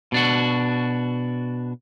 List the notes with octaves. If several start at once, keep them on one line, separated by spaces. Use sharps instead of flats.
B2 D4 F#4